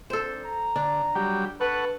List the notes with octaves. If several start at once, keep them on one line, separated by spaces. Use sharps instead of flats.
C4 D4 D#4 A4 C5
A#5
D3 D4
F#3 G3 G4
A4 B4 F#5 C#6